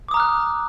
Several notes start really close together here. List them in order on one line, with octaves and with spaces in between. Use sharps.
D6 D#6 A#5 F6 F#6